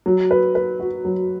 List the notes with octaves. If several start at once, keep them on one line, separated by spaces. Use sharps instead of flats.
F#3
B4
B4
F#4
F#3